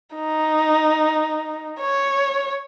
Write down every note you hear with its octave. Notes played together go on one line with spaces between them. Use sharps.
D#4
C#5